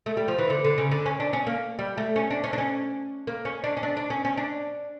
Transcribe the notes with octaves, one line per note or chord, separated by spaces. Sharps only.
A3
G3
F3
E3
D3
D3
C#3
D3
C#4
D4
C#4
A#3
G3
A3
C#4
D4
C#4
D4
C#4
A#3
C#4
D4
C#4
D4
D4
C#4
C#4
D4